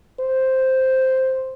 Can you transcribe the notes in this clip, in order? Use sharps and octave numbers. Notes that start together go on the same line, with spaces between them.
C5